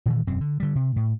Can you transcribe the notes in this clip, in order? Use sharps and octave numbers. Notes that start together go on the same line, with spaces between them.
A#2 D#3 E3
E1 F#2 C4
D3
D3 G3
C3
A2